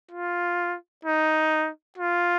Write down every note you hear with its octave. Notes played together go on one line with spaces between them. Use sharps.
F4
D#4
F4